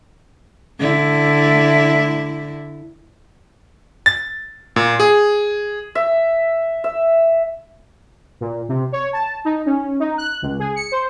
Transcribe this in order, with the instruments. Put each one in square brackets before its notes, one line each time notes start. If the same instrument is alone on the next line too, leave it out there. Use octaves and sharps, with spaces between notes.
[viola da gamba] D3 E4
[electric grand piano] A6
A#2
G#4
[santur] E5
E5
[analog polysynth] A#2
C3
C#5
A5
D#4
C#4
D#4
F#6
C#2
G#4
C#7
C5